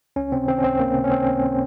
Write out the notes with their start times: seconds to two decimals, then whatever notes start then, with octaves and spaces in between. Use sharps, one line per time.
0.16 C#2 C#4
0.32 C3 C4
0.48 D#3 C4
0.58 C#4
0.64 C#2 C4
0.79 C#2 A#3
0.95 C3
1.04 C#4
1.11 D#3 C4
1.27 C#2